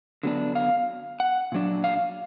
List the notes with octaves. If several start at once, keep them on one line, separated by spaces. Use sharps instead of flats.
D3 F#3 B3 D4
F5
F#5
A#2 F#3 D4
F5